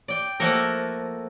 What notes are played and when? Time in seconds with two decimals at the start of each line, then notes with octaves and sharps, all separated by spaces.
0.08 D5 G5
0.40 F3 A3 A#3 F#4 A4 A#4